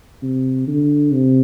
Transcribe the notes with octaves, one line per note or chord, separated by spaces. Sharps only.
C3
D3
C3